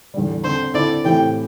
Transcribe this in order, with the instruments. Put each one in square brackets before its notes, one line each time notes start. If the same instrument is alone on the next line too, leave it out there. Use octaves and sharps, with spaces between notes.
[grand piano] E2 D3 G3
[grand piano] D3 C4 A4 [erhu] C5
[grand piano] D3 C4 E4 A4 [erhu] D5
[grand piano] A2 E3 C4 G4 [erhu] G5